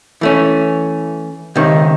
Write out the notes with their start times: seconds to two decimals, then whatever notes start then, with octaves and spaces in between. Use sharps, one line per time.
0.21 E3 A3 C#4
1.56 C#2 C3 D#3